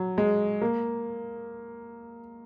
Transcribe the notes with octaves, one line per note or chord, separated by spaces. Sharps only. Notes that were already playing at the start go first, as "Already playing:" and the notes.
Already playing: F#3
G#3
A#3